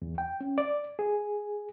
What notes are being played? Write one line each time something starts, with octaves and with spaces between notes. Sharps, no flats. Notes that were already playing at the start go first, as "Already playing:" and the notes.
E2
G5
C#4
D5
G#4